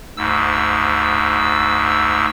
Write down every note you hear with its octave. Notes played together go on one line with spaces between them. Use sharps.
D2 G#2 E6